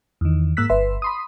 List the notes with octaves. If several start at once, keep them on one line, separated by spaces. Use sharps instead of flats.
E2 D#3
G#2 A#3 E6 F#6 B6
G1 B4 E5 C6
B5 C6 D#6